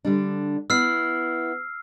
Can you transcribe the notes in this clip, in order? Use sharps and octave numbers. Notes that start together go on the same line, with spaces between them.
D3 G3 D4
B3 E4 E6 F6 C7